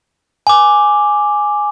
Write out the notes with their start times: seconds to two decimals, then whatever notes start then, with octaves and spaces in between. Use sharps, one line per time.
0.47 G#5 D6